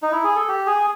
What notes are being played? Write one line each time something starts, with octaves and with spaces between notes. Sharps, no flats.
D#4
E4
G#4
A4
G4
G#4